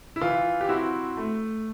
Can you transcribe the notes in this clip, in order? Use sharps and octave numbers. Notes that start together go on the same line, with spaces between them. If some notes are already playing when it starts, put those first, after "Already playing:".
E4
E3 F4
G4
C4 E4 F#4
A3